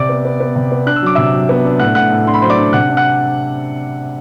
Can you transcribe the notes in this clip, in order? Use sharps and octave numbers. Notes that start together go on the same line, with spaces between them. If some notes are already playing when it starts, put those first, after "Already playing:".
Already playing: C3 D5 D6
B3
B3
B3
C3
B3
D4 F#6
E6
F#3 D6
C3 E5 E6
F#3
B3
D4
A2 F#5 F#6
A2 F#5 F#6
A2
D4 C6
B5
F#3 C5 C6
D5 D6
D4
C3 F#5 F#6
D4
F#5 F#6